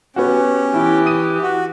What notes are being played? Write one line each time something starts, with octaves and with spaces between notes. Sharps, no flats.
B3 C#4 F#4 G4
E3 E4 G4
D#6 D#7
F#4